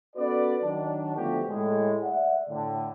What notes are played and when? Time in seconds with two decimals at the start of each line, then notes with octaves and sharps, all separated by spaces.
0.16 B3 C#4 F#4 A4 B4 D5
0.63 D#3 F#3 D4
1.15 D3 F3 A3 B3 F#4 G4
1.49 A2 G#3
2.03 D5 E5 F#5
2.49 A2 D3